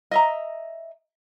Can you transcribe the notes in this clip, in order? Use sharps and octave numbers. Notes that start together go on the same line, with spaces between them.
D#5 E5 A#5